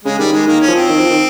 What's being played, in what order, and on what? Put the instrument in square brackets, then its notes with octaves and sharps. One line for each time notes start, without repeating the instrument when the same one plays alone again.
[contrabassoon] C#3 [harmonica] G#3
[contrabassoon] D#3 [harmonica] G3
[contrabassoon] D#3 [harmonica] G#3
[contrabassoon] D#3 [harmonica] A#3
[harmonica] C#4
[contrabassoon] F3
[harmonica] C4
[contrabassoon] D#3
F3
D#3